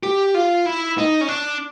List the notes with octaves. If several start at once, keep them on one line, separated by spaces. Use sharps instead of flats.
G4
F4
E4
D#4
C#4
D4